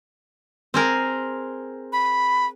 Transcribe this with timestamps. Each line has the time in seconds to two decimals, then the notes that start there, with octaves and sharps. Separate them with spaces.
0.74 C4 G#4 A#4
1.93 B5